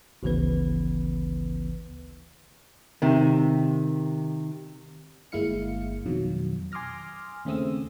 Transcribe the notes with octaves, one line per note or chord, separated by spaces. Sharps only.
G#1 D2 C#3 E3 B3 B4
C3 D#3
G1 G#3 A#3 E4 F5 C#7
F2 B2 D#3 F#3
G#5 C6 D6 D#6 F6 A#6
D#2 C#3 A3 C4 D#6 E6